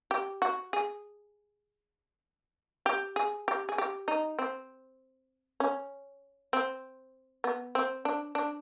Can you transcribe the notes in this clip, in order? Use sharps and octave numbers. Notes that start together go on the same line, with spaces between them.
G4
F#4
G#4
G4
G#4
G4
G#4
G4
D#4
C4
C#4
C4
B3
C4
D4
D4